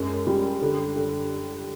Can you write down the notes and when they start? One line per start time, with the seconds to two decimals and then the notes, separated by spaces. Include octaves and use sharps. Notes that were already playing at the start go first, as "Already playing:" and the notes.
Already playing: F#2 G#3
0.27 G3
0.62 D3
0.96 D3